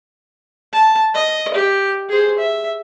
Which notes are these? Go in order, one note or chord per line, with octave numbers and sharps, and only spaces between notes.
A5
D#5
G4
G#4 C5
E5